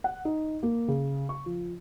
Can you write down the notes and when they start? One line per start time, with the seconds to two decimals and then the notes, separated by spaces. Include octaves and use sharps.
0.04 F#5
0.25 D#4
0.63 A#3
0.88 C#3
1.29 C#6
1.46 F3